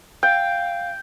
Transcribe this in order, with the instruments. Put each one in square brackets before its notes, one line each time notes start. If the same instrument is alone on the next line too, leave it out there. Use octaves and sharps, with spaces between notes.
[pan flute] F5 [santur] G5